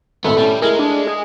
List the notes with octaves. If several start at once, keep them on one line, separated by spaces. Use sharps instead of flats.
G#1 A2 B3 A4
A2 G3 C#4
G#3 A3 E4 G#4 A#4
D4
G#4